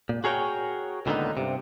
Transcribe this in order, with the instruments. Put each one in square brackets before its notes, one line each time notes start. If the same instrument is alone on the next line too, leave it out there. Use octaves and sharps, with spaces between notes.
[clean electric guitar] A#2
F#4 G#4 A#4 C#5 F5 G5
C#2 A#2 D3 D#3 B3 D#4
G2 C3